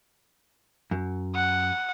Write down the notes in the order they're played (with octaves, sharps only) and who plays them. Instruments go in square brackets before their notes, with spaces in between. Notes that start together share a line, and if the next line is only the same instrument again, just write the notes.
[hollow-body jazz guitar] F#2
[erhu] F#5